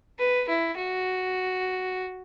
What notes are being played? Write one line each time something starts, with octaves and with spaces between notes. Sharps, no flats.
B4
E4
F#4